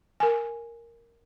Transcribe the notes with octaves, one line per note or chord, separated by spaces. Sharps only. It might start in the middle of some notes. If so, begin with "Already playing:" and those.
A#4 G#5